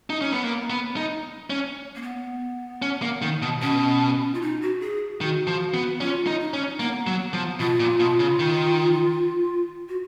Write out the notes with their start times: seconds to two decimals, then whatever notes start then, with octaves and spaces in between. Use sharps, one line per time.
0.10 D#4
0.21 C#4
0.32 B3
0.44 A#3
0.70 B3
0.97 D#4
1.50 C#4
1.96 A#3
2.02 B3
2.82 C#4
3.02 A#3
3.22 D#3
3.42 B2
3.62 B2 C#4
4.34 F4
4.42 D#4
4.62 F#4
4.81 G#4
5.21 D#3 F#4
5.47 F3
5.74 B3
6.00 C#4 F4
6.27 D#4
6.40 D#4
6.54 C#4
6.80 A#3 B3
7.07 F#3
7.33 F3
7.59 B2 F4
7.80 A#2
8.00 B2
8.20 C#3
8.39 D#3
9.89 F#4